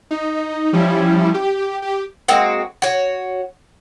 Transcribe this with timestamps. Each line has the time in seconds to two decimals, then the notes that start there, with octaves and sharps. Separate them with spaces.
0.11 D#4
0.73 F3 G3 C#4 E4
1.34 G4
1.82 G4
2.28 G#3 A#3 C4 F#4
2.82 F#4 C#5